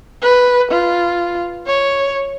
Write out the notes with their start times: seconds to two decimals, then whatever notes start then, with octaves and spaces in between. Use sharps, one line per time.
0.22 B4
0.72 F4
1.67 C#5